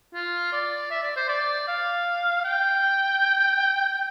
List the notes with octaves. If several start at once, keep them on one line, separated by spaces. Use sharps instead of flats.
F4
D5
E5
D5
C5
D5
F5
G5